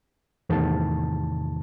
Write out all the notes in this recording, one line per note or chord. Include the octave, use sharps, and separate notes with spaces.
E2 A2 C3 D#3 A5